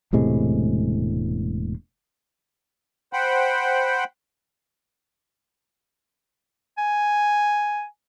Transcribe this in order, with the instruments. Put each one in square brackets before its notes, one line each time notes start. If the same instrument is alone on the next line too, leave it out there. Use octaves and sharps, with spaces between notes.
[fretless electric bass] E1 A2 C3 G#3
[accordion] C5 F#5 G5 B5
[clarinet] G#5